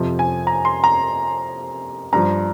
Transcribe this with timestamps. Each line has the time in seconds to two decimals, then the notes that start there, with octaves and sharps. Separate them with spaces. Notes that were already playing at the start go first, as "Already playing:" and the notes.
Already playing: F2 C3 F3
0.19 G#5
0.47 A#5
0.65 C6
0.84 A#5
2.13 G2 A#5
2.16 F3